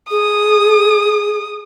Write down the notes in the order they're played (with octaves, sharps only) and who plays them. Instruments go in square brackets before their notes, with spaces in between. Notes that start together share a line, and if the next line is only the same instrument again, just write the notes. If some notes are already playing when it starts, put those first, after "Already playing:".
[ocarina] G#4 [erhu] D#6